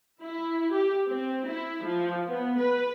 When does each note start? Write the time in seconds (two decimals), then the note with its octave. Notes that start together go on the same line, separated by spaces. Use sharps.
0.22 E4
0.71 G4
1.07 C4
1.46 E4
1.83 F3
2.26 B3
2.58 B4